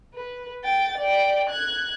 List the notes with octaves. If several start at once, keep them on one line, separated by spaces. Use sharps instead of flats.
B4
G5 A6
D5 G5
F#6 G#6